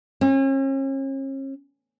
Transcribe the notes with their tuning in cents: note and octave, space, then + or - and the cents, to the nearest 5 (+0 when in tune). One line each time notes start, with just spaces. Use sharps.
C#4 -40